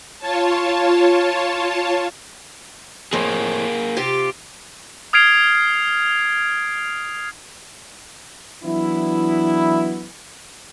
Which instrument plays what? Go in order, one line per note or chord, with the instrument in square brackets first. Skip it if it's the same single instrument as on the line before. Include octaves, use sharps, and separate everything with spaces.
[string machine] F4 C#5 A5
[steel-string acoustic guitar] F2 A2 [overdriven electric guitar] A#3 G#4
[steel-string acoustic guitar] C3 F4 G4
[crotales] D#6 F6 G#6 C7 D7 F7
[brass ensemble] E3 F#3 B3 D4 E4